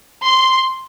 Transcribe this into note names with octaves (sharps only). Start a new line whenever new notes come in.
C6